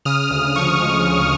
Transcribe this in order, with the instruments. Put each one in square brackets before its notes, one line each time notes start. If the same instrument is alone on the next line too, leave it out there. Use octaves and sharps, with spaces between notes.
[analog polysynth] C#3 D#6 F6
D2
F3 C#6 D#6
G#3
C#3